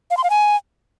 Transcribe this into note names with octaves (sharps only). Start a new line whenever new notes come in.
F5
C6
F5
G#5